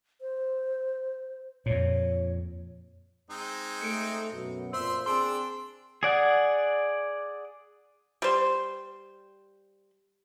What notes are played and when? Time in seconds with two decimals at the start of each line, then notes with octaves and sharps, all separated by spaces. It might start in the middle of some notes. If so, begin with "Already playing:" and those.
0.21 C5
1.66 F2 A#2 C#5
3.30 G#3 C4 D#4
3.81 A3 C#7 D7
4.32 F#2 B2
4.73 F2 A#2 F3 C5 E5 C6 E6
5.06 C4 D4 G#4 C6 E6 D7
6.03 G#4 D5 F#5
8.22 G3 C5